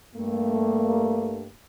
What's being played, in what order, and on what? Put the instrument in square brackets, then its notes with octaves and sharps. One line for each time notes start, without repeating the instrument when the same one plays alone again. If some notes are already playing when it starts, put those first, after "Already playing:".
[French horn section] G2 A3 A#3